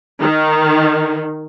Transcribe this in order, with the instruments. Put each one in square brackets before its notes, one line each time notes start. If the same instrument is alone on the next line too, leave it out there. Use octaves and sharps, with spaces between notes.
[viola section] D#3